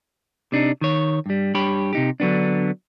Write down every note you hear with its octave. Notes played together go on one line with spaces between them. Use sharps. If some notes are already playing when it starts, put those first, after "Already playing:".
C3 D4 D#4
D#3 C#5
G2 G3
G2 G4 C#5 B5
C3 D#4 G4
D3 F#3 B3 D4